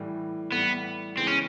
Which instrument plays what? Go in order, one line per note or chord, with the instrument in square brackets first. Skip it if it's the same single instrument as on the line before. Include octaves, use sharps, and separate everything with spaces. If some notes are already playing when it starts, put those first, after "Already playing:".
Already playing: [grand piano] A2 E3 G3
[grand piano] A2 E3 G3 [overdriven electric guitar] B3
[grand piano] C#2 C#3 E3 G#3 B3 [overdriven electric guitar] C4
[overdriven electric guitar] C#4